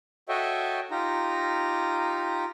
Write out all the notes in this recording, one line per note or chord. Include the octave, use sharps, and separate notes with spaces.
F#4 A4 C#5 D#5 E5 G5
D#4 F4 G4 A#5